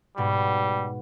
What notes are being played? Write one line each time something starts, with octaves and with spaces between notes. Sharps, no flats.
G#2 B2 G3 F#4